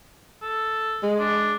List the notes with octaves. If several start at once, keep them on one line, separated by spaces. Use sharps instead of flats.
A4
G#3
D4